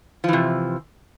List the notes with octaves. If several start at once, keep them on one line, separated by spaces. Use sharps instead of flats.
C3 E3 F3